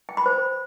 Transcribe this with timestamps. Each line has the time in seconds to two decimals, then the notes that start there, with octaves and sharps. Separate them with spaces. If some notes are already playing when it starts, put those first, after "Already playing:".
0.09 G5
0.17 B5
0.26 C5